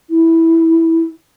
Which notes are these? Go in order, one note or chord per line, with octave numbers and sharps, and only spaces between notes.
E4